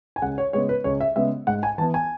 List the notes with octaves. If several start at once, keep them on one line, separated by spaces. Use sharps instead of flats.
G#5
C#2 F#5
C#5
C#3 G#3 B3 C#5
B4
C#2 C#5
E5
C#3 G#3 B3 E5
G#2 F#5
G#5
E3 B3 A5
G#5